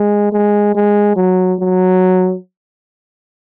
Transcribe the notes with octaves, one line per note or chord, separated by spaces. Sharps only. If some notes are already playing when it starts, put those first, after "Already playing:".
Already playing: G#3
G#3
G#3
F#3
F#3